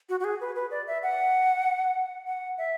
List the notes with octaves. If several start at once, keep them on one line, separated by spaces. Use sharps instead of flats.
F#4
F#4
G#4
B4
B4
D5
E5
F#5
F#5
E5